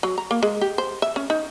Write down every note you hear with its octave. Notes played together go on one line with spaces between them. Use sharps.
F#3
A#5
A#3
G#3
G4
C5
E5
C#4
D#4